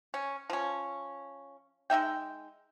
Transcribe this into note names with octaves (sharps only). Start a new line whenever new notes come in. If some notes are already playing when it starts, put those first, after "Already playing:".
C#4
F3 C#4
G#3 D#4 E5 G5